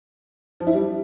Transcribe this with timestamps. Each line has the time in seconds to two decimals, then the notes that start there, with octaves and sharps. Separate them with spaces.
0.60 F3
0.67 E4
0.73 G3